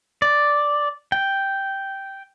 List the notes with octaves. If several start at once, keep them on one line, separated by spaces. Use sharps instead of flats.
D5
G5